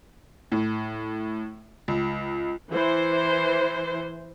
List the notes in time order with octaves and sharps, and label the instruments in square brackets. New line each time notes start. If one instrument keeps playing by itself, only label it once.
[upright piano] A2
C#2
[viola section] E3 C5